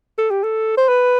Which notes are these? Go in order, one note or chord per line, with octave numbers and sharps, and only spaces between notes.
A4
G4
A4
C5
B4